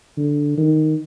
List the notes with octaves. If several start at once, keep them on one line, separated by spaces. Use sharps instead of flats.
D3
D#3